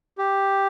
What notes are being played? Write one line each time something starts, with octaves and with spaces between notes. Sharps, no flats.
G4